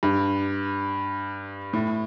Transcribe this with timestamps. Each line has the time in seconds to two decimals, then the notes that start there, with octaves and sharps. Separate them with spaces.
0.03 G2
1.73 A2